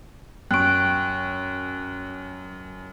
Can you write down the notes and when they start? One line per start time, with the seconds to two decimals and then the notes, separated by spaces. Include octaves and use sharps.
0.51 F#2 G5 C#6 F#6 D7